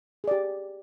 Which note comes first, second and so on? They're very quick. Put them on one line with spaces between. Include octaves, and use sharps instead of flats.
G#4 D5 G4